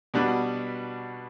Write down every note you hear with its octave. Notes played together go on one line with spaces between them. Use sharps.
B2 G3 D4 F#4 B4